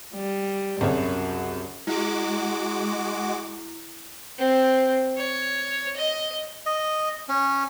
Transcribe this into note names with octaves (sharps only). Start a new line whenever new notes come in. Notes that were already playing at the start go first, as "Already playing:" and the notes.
G3
C2 F#2 C#3 C#5
G#3 E4 F#4 D6
C4
C#5
D#5
D#5
C#4